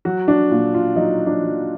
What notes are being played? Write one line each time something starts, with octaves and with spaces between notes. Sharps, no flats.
F#3 F#4
D4
A#2
F4
F#3 D#4
D4
F#3